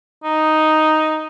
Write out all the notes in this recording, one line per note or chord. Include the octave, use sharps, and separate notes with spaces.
D#4